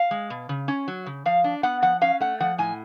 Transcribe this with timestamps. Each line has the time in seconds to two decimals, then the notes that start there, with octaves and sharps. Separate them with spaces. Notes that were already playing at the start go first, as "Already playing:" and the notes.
Already playing: F5
0.11 G#3
0.30 B2
0.49 C#3
0.68 C#4
0.88 F#3
1.06 C#3
1.25 F3 F5
1.44 D4
1.63 B3 F#5
1.82 F3 F#5
2.01 C#4 F5
2.20 A3 F#5
2.40 F3 F#5
2.58 A2 G#5